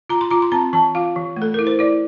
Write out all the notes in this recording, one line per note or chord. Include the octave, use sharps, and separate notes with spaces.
F4 A#5
C6
F4 A#5
C6
C4 A#5
E3 A5
F4 F5
E3
A3
A4
E4 A#4
C5
E4 D5